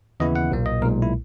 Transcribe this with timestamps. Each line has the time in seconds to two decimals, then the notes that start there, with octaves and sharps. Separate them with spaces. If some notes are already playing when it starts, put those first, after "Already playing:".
0.20 D#2 C#3 E3 B3 E4 D#5
0.36 F#5
0.51 B1 A#2 A#3
0.66 D#5
0.81 B1 A#2 G#3 A#4
1.02 E4